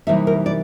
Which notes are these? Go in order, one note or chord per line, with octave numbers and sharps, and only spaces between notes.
C3 E3 G3 A#3 D#4 E5
A#4
D5